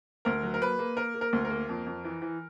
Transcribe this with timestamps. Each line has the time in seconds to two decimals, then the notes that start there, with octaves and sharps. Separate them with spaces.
0.25 D2 A#4
0.43 F#3
0.54 A#4
0.61 A#3 B4
0.79 A#3
0.96 A#3 A#4
1.15 A#3
1.21 A#4
1.33 D2
1.45 A#4
1.50 A#3
1.69 F2
1.86 F2
2.04 E3
2.22 E3